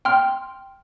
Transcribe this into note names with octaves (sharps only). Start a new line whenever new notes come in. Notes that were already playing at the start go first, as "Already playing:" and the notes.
G5 C6 F6